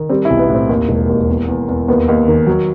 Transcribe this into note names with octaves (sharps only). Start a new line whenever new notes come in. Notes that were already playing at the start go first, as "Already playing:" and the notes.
Already playing: D#3
G3 C4
E4
B1
B3
A2
C4
D#2
E1
D#2
E2
E2
E2
D#2 B3
D#2
D#3
F#3